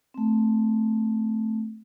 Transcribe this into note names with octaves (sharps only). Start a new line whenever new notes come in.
A3 C4